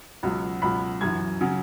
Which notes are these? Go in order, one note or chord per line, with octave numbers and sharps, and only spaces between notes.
C#2 B2 F#3
C#2 B2 F#3 B5
F#2 E3 G#6
C#3 F#3